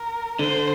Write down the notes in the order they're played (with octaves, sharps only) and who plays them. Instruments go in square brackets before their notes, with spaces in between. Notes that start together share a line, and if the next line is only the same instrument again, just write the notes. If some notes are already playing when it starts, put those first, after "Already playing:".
Already playing: [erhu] A#4
[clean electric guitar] D3 [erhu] C5